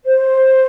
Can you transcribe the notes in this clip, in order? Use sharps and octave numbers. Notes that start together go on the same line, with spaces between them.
C5